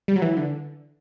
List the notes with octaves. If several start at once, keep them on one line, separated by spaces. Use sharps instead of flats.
G3
F#3
E3
D3